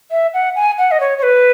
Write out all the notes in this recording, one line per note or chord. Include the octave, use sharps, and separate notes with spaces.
E5
F#5
G#5
F#5
D#5
C#5
C#5
B4